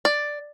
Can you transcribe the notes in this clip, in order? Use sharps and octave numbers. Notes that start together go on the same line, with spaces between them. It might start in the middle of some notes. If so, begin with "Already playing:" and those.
D5